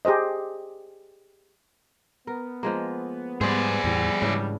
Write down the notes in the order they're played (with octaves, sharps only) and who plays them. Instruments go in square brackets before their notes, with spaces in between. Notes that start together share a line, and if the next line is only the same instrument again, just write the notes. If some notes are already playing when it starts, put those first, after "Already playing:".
[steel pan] G4 G#4 C5 D#5
[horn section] B3 [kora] A#4
[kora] F3 G#3 A#3
[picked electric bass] G#2 G3 [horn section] B3 [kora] C4 C5 [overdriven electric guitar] G#4 D5
[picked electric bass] E2 A2 E3 [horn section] G3
[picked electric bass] G#2 [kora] C#3 E3 D4